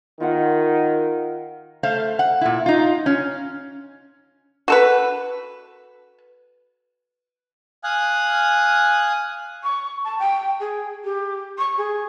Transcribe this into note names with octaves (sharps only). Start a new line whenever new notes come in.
D#3 F4 E5 F#5
A3 C5 F5
F#5
A#2 E4
D#4 F4
C#4
F#4 A4 B4
F5 G#5 D#6 F#6
C#6
A5
G5
G#4
G4
C#6
G#4